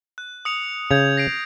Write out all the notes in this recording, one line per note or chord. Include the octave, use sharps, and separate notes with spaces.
F#6
D#6 C#7 F7
C#3 G6 G#6 F7
A#6 C7 D7